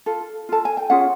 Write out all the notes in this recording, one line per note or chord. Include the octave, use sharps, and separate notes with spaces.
F4 A4
F4 A4 A5
G#5
G5
C#4 F4 G#4 F#5